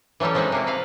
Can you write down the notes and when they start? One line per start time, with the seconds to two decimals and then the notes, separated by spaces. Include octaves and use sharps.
0.20 E3 F#3 G3 A3 C#4
0.34 F3 F#3 G#3 C4 D#4 F#4
0.52 C3 A#3 C4
0.67 B4 F5